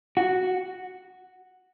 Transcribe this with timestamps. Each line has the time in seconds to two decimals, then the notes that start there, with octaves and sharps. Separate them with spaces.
0.17 F#4